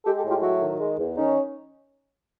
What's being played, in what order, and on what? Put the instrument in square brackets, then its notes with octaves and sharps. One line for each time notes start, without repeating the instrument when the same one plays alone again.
[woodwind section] G#3 G4 A4
G4 A4
A2
F4 G4
F#3 E4 F#4
D#3
G#3
E2
D#3 C#4 D#4